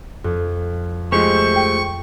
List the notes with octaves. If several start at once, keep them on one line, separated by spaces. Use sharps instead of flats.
F2
F3 G#3 A3 G4 C5 C#6
G5